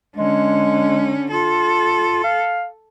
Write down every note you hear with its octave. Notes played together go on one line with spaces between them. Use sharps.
D3 G#3 C#4
F4 A4
F5